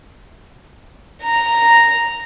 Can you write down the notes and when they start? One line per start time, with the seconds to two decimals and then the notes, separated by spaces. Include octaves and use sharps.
1.24 A#5